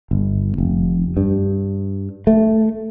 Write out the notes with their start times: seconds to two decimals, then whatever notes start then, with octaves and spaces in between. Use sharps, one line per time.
0.11 G1
0.58 F1
1.17 G2
2.27 A3